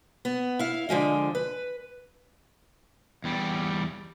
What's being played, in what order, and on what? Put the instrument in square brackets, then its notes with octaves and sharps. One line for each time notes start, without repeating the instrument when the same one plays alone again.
[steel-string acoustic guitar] B3
E4 F5
D3 F3 G#3 F4
B4
[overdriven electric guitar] E2 G3